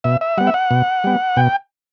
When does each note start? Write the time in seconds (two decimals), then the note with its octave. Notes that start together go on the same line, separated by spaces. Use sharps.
0.04 B2 E5
0.21 E5
0.38 G3 B3 F#5
0.47 E5
0.54 F#5
0.71 B2
1.04 G3 B3
1.37 B2 G5